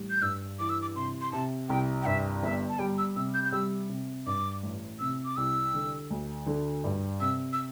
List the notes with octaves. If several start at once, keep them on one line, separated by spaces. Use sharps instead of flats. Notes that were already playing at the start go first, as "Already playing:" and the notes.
Already playing: A1 G3
G6
G2 E6
E3 D6
E6
D6
C3 C6
C6
C3 A5
C2 G5
G5
G2 E5
G1 E5
A5
G3 G5
E6
C3 E6
G6
G6
G3 E6
C3
G2 D6
A1
C3 E6
D6
C2 E6
D3
D2
D3
G2
C3 E6
E6